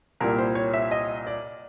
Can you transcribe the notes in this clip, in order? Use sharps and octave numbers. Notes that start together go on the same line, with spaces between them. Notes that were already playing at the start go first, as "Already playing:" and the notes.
C2 A#2 G3 A#3 A#4
C5
C#5
E5
D#5
D5